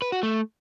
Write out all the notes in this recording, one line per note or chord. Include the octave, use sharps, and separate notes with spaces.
B4
F#4
A3